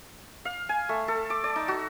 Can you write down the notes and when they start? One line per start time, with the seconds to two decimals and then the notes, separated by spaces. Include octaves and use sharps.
0.45 F5
0.69 G#5
0.89 A3
1.08 A4
1.30 D6
1.44 D5
1.56 D#4
1.68 F#4